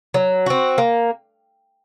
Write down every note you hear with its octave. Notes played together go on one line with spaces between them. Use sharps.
F#3
C4 F#4
A#3